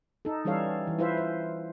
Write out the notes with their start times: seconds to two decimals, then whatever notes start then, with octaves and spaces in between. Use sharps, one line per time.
0.25 D#4 A4
0.45 E3 G3 C#4 A4 C#5 F5
0.87 E3
0.99 E4 F4 B4 C5 E5 F5
1.17 C5